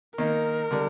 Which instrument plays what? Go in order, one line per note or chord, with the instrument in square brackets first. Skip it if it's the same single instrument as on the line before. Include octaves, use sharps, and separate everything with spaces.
[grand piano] D#3 A#3 D#4 [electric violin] A#4
[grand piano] D3 G3 D4